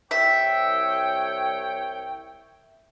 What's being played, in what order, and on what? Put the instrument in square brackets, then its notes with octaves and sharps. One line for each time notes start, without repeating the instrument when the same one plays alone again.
[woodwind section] C2 C#5 G5 [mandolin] E5